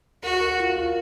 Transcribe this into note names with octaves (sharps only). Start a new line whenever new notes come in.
F#4 A#4
A#4
F4
F4